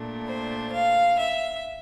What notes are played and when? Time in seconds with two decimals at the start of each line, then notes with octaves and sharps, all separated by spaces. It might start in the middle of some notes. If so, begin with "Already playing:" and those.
Already playing: A#2 A3 D4
0.26 C5
0.72 F5
1.18 E5